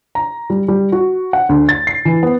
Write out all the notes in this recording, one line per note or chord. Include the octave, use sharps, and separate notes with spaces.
A#5
G3
G3
F#4
F#5
D2
A6
C7
E3
B3